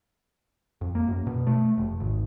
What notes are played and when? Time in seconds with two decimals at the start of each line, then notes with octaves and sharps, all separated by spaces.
0.81 F2
0.95 A#3
1.08 F#2
1.27 B2
1.47 A3
1.78 F1
2.00 G#1